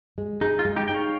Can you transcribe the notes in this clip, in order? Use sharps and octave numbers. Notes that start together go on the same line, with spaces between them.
G#3
D#4 G#4
F4
G#3
D#4 G4
D#4 G5
C#5 F5